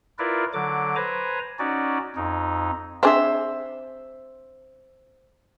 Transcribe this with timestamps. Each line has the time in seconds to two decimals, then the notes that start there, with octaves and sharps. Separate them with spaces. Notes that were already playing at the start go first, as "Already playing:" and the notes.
0.19 E4 F4 A#4 B4 D5
0.54 D3 F#3 D6
0.96 B4 C5 G#5 A#5
1.59 C#4 D#4 F#4 D5
2.16 F2 D#4
3.03 C4 D4 G#4 C5 E5